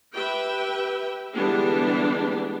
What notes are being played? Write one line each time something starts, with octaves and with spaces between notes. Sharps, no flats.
G4 B4 E5 G5
D3 E3 G3 G#3 B3 D4